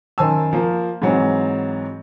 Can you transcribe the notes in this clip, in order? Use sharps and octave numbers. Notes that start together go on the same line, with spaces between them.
F#2 D#3 C5 G#5 A5 E6
F3 A#3
G#2 E3 F#3 C4